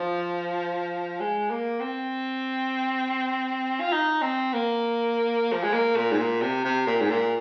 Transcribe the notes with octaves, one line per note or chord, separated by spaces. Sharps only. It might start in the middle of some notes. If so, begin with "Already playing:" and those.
Already playing: F3
G#3
A#3
C4
F4
D#4
C4
A#3
F3
G#3
A#3
A#2
G#2
A#2
C3
C3
A#2
G#2
A#2